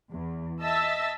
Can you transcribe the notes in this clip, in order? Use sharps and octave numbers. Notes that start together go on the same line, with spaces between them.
E2
D#5 E5 A5 E6 A6 B6